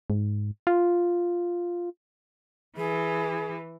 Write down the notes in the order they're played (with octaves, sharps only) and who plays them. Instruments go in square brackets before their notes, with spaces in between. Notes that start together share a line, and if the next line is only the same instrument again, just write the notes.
[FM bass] G#2
F4
[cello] E3 [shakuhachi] G#4